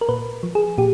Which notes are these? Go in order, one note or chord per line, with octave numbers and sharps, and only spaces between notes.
A#4
A#2 B4
F3
G#4
A#2 G4